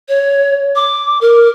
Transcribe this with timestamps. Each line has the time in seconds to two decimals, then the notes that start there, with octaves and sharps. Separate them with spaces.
0.08 C#5
0.76 D6
1.21 A#4